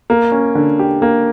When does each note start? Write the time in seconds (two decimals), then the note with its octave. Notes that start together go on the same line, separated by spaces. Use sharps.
0.10 A#3
0.32 C#4
0.55 D3
0.79 G4
1.02 A#3